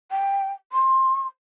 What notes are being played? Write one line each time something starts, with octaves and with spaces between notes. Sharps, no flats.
G5
C6